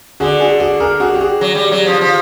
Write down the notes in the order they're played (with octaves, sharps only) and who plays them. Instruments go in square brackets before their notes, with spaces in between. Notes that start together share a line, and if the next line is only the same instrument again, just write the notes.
[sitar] D3 [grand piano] F#4 G#4
[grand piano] F#4 G#4
F#4 G#4
G#4 A#4
F#4 G#4
G4
F#4 G#4
[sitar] F#3
G3
F#3
F3
F3